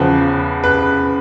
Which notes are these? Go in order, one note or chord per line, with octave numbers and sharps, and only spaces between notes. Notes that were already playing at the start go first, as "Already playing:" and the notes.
Already playing: E2 C#3 F3 B4
B4